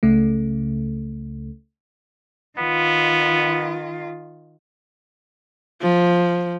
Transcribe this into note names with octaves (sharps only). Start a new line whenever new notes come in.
C#2 C#3 A3
D#3 B3 F4
F3